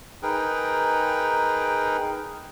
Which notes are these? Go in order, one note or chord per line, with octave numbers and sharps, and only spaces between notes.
D#4 G#4 A#4 B4 G5